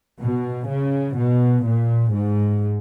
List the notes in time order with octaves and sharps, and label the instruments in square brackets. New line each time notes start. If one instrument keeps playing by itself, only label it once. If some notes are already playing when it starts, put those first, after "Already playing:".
[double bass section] B2
C#3
B2
A#2
G#2